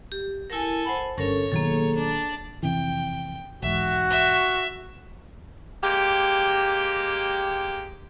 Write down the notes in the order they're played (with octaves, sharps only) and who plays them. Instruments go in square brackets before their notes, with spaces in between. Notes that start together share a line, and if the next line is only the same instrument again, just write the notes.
[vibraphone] G4
[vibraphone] E4 A#4 [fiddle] A4 G#5
[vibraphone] C5 F#5 B5
[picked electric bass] G1 G2 [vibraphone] C#4 A4 A#4 [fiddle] C#5
[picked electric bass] B2 D#3 F#3 [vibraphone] A#3 G#4 A4
[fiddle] D4 D5
[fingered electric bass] F2 C3 E3 [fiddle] G5
[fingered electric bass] B1 E2 G#2 [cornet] F#4 [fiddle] E5
[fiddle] E5
[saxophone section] G#3 A#3 G4